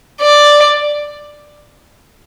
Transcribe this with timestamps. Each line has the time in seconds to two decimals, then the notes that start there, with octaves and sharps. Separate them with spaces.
0.21 D5